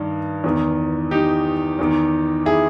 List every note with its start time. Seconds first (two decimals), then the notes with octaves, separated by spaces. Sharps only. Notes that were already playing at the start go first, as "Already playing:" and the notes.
Already playing: G2 D#3 D#4
0.44 E2 D#3
1.11 D#4 G4
1.79 E2 D#3
2.46 E4 G#4